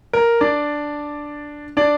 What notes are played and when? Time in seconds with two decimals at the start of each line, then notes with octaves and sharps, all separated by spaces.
0.13 A#4
0.41 D4 D5
1.77 D4 D5